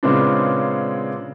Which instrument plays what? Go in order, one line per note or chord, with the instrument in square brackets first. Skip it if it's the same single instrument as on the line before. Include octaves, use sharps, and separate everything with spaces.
[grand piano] A#2 C#3 G#3 B3 C4 D4